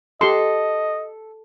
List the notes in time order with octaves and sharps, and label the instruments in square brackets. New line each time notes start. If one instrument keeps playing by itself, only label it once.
[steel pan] G4 C6 [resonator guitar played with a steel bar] A4 [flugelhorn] D#5